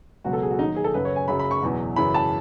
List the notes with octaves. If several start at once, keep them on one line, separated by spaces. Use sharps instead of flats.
C#2 B2 F#3 F#4
A4
G#4
F#4
D#2 D#3 F#3 D#4
G#4
A4
F#2 C#3 F#3 B4
C#5
G#5
F#2 C#3 F#3 B5
B5
C#6
E2 B2 F#3
F#2 C#3 E3 B5
A5